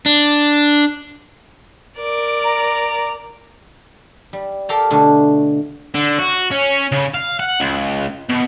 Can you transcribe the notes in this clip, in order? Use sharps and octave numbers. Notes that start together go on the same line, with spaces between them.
D4
A#4 D5
A#5
G3
G4 A4 A#4 F5 G5 A5
B2 D3 A3
D3
F#4
C#4
C#3
F5
F#5
C#2
B2